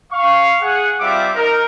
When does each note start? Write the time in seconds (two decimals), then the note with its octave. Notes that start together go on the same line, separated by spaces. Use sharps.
0.12 F5 C#6
0.62 G#4 F#5
1.00 G3 C4 F4 E5 F5 D6
1.36 D#4 A#4